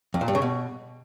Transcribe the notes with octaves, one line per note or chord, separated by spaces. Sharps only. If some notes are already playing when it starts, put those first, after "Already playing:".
F2
A#2
G2
C#3
B2